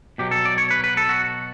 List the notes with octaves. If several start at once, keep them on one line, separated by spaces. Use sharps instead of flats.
B2 F#3 G4
A4
D5
C#5
B4
B4
A4
F#4